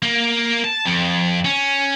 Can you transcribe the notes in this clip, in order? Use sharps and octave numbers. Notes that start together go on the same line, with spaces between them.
A#3
A5
F2
C#4